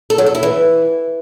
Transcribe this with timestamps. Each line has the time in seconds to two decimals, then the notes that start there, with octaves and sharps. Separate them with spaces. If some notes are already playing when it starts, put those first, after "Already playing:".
0.10 A4
0.18 F#3
0.26 A4
0.35 E4
0.43 E3